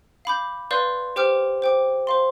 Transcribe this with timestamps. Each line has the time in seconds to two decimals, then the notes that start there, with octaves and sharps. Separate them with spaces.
0.25 F5 B5 D6 G6
0.71 B4 D5 F5 C6 G6
1.16 G4 C5 G5 D6 F6
1.62 C5 G5 D6
2.07 C5 F5 C6